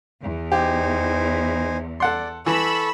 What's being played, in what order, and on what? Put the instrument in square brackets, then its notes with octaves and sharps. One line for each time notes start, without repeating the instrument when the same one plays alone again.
[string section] E2
[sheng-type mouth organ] D#4 C5 G#5 [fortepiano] G4
[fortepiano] A4 F#5 C6 [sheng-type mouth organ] D5
[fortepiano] E3 [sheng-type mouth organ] A4 C#6 [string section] B5 E6